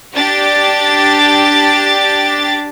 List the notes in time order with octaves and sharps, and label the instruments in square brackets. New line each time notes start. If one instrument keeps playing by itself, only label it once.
[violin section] D4 G4 A6